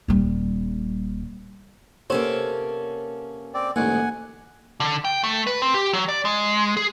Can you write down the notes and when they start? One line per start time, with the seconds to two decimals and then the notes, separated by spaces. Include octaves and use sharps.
0.08 D#1 G3
2.10 C3 A#3 B3 C#4 A4 C5 C#5
3.54 C4 D5
3.76 A1 D2 G#2 A#3 F#5 G#5
4.80 D3
5.05 G5
5.24 A3
5.47 B4
5.62 C4
5.74 G4
5.93 F#3
6.08 D5
6.25 G#3
6.77 G#4